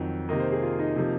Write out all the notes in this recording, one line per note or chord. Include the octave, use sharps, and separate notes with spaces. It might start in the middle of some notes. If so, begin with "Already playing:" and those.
Already playing: F2 D#3 F#3
C3 D#3 A#3 D#5
C5
G#4
F4
D#4
C3 F3 A#3